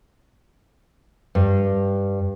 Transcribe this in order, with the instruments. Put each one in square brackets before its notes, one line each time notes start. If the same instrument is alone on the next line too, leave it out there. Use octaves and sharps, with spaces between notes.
[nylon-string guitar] G2